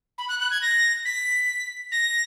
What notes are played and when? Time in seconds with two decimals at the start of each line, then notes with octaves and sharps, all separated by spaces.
0.18 B5
0.29 F#6
0.40 F#6
0.51 G#6
0.62 A#6
1.05 B6
1.92 A#6